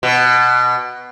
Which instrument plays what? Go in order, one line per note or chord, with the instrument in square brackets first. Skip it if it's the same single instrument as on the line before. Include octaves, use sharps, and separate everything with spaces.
[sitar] B2